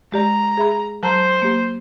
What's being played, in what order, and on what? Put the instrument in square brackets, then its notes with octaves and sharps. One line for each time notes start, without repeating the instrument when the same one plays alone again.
[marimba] G#3 G4 D5 [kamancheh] A#5
[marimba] G#4 E5 B5
[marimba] F#3 A5 A#5 [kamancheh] C5
[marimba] A#3 G4